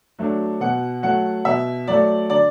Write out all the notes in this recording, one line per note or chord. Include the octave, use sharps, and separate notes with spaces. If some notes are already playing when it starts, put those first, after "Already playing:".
F#3 A3 D4
B2 F#5
F#3 A3 F#5
B2 E5
F#3 A3 D5
D3 D5